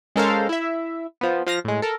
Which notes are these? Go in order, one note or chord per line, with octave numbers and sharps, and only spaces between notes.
G#3 C#4 A4 A#4 C5 F5
E4 E5
F3 B3
F3 F5 A#6
A2 G#3
A4 A#4